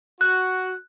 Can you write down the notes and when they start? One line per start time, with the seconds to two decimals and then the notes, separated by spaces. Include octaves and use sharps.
0.21 F#4 F#6